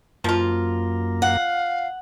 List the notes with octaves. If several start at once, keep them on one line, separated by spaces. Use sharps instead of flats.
F#2 F3 A#3 F4
F5 F#5